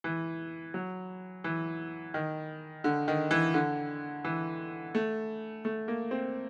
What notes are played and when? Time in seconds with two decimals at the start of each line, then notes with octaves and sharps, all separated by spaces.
0.04 E3
0.74 F#3
1.44 E3
2.14 D#3
2.84 D3
3.08 D#3
3.31 E3
3.54 D3
4.25 E3
4.95 A3
5.65 A3
5.88 A#3
6.11 C4